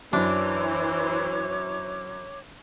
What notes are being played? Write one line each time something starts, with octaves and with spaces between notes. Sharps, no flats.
F#2 E3 D4 C5 C#5 D6